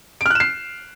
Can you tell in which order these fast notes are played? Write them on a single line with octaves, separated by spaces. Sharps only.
D7 F6 F#6 E7 C7